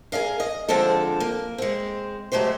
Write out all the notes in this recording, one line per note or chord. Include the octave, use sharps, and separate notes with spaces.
G#4 A#4 D#5 F5
D#5
D3 F3 G#3 C4 A4
A#3
G#3 C4
F#3 G#3 A3 G4 C5